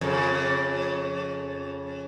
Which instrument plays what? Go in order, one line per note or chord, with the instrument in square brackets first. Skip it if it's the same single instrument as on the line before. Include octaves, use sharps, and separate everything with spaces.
[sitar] F2 C#3